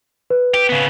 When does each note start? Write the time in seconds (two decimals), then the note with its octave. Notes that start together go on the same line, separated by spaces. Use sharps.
0.30 B4
0.54 G4
0.69 C#3 B3